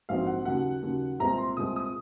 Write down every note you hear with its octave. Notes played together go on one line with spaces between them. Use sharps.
A#1 G#2 F#3 C4 F5
F#5
D#2 C#3 F#3 F#5
D#2 C#3 F#3
C2 A#2 G#3 C4 A#5
C6
C2 A#2 G#3 C4 D#6
D#6